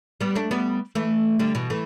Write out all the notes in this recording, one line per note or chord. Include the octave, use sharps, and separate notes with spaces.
G3 B3
A3 D4
G3 B3
E3 A3
D3 G3
B2 E3
E3 A3